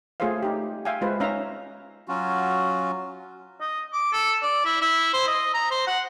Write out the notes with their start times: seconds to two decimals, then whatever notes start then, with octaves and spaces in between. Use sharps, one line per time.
0.20 A3 F4 G#4 C5 C#5 F5
0.43 D#4 G4
0.85 E5 F5 G5 G#5
1.01 G#3 F4 B4 C5
1.20 C#4 D#4 E5 F5 A#5
2.08 F#3 C#4 F4 F#4
3.61 D#5
3.93 D6
4.13 A4
4.42 D5
4.65 E4
4.81 E4
5.13 C5
5.27 D#5
5.54 A#5
5.71 C5
5.87 F#5